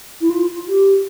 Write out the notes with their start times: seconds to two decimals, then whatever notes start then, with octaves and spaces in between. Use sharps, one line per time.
0.21 E4
0.30 F4
0.68 G4